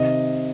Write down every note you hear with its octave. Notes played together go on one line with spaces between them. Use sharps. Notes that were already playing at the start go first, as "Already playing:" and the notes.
Already playing: C3 D#3 D#5